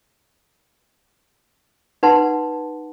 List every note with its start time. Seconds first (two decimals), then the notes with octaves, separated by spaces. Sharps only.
2.03 D#4 B4 F#5 A5 C6